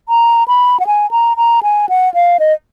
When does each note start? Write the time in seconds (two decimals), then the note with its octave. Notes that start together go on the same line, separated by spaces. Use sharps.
0.09 A#5
0.48 B5
0.80 F#5
0.87 G#5
1.11 A#5
1.37 A#5
1.63 G#5
1.89 F#5
2.14 F5
2.40 D#5